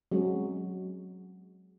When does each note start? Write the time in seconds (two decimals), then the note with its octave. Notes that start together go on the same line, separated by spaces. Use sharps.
0.12 F#3 G#3 C4 C#4